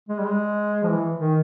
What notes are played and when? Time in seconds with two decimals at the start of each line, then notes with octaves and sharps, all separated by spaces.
0.09 G#3
0.20 G3
0.25 G#3
0.83 F3
0.88 E3
1.19 D#3